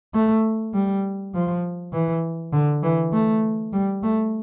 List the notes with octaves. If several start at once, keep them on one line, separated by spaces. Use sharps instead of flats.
A3
G3
F3
E3
D3
E3
A3
G3
A3